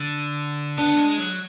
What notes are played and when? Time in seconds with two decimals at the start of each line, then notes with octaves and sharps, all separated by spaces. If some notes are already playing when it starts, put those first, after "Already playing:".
Already playing: D3
0.78 B3 D4
0.97 G#3
1.18 F#3